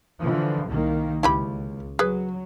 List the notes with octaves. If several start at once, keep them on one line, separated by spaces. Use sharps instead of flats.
D3 E3 F3
C2 D#3 A#3
C#2 E4 G4 B5
F#3 G#4 B4